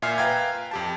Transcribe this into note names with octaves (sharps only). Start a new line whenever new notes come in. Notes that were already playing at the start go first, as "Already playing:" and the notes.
A#2 E5 G#5 F6 C7
B4 F5 G5 A#5 G#6
F2 G4 A5